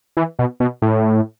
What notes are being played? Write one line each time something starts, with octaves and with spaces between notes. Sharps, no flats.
E3
B2
B2
A2